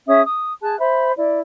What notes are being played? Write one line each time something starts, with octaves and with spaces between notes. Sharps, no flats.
C#4 G#4 E5 D#6
D#6
G#4 A5 F#6
C5 E5 B5
E4 D5